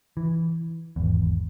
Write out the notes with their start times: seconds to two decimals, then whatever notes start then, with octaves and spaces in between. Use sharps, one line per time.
0.17 E3
0.96 G#1 E2